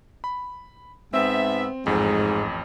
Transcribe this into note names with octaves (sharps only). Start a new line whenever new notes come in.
B5
G#2 B3 C4 E5
A1 F2 G#2